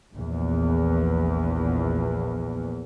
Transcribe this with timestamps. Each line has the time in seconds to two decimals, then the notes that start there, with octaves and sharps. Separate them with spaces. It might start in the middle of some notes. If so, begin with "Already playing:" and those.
0.13 A#1 E2